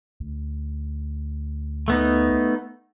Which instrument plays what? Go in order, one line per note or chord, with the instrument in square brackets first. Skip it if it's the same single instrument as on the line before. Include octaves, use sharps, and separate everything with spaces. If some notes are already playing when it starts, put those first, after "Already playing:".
[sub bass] D2
[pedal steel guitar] A3 B3 D#4